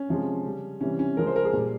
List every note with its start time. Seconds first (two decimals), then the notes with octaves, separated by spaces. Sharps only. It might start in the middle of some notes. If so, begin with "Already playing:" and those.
Already playing: C#4
0.09 C3 F3 G#3
0.44 C#3 G3
0.81 C3 E3 G3 C#4
0.99 C#4
1.17 C#3 F3 G#3 A#4
1.27 C5
1.36 A#4
1.45 G#4
1.53 A#2 G3